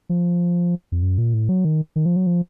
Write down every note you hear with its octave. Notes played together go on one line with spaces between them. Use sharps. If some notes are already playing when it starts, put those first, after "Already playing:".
F3
F2
F#2
A#2
A2
F#3
D#3
D#3
F3
F#3
F3